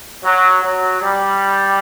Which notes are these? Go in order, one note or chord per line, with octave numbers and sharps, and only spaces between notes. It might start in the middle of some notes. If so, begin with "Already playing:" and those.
F#3
F#3
G3